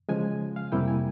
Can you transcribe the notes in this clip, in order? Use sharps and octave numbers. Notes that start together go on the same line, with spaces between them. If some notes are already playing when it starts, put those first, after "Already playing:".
C#3 F3 G#3 G#5
F5
F2 C3 G3 A#3 E4 G5
G#5